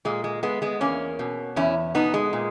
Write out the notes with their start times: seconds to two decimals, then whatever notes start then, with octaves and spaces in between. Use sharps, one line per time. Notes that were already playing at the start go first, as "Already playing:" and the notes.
0.05 A#2 G#3
0.24 G#3
0.43 G#3 B3
0.62 G#3 B3
0.81 E2 A#3 C#4
1.19 B2
1.56 E2 C#4 E4
1.95 B2 B3 D#4
2.14 G#3
2.33 A#2